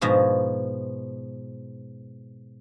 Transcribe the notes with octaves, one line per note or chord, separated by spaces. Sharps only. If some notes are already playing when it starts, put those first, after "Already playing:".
G#2 B2 F3 G#3